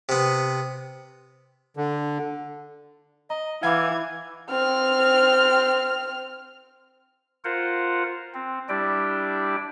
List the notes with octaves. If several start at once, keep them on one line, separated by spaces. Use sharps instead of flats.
C3 B3
D3
D#5 A#5
E3 F5 F#5 B5 D6 G#6
C4 F6
F4 A#4 C5 F#5
C4
G3 D4 E4 G4 D5 G5